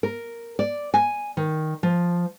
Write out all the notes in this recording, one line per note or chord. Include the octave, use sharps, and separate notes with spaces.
A#4
D5
G#5
D#3
F3